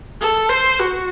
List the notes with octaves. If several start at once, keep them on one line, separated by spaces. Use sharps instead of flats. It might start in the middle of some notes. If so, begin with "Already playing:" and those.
A4
C5
F#4